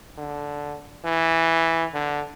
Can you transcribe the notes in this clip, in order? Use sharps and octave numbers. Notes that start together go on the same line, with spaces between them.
D3
E3
D3